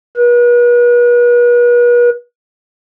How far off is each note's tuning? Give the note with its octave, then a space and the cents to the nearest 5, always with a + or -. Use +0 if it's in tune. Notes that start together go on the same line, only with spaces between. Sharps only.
B4 -40